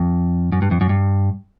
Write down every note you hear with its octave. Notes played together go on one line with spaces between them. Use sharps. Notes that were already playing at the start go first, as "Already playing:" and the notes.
Already playing: F2
F#2
G2
F2
F#2
G2